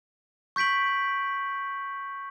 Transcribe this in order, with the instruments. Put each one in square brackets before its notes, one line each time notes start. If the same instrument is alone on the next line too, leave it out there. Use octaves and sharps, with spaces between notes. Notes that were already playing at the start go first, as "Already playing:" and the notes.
[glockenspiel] C#6 G6 B6 D7 F#7